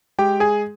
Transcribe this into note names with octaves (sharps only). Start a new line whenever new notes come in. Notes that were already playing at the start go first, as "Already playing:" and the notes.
G#3 G4 G5
G#4 G#5